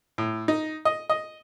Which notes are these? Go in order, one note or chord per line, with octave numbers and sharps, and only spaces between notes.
A2
D#4
D#5
D#5